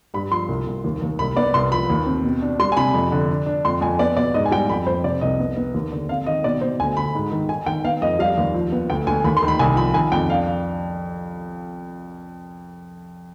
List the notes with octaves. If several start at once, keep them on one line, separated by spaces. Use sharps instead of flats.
G2 B5
F3 C6
C2
C2
D#2
D#2
C2 B5
B3 D5
C2 C6
F3 B5
D#2
C4
B2
D4
G3 C6
G#5
C3 B5
F2
D3
D4
D4
F2 C6
F2 G#5
B3 D5
B2 D5
G#2 D#5
G#5
G3 G5
F2 B5
F2 C5
C3 D5
C2 D#5
B3
B3
D#2
D3
C4 F5
D#3 D#5
B2 D5
B2 C5
D2 G#5
D2 B5
G#2
D#3
D#3 G#5
D#3 G5
B3 F5
F2 D#5
G3 F5
D#2
F3
B3
D2 G5
D2 G#5
D#2 B5
C6
D#3
B5
C2 G#5
F3 B5
D#3 G#5
F2 G5
D4 F5